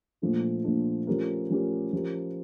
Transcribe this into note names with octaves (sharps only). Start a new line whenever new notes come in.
A#2 F3 A3 D4
A#2 F3 A3 D4
F3 A3 C#4 G4 A#4
F3 A3 C#4 G4 A#4
F3 C#4 G4 A#4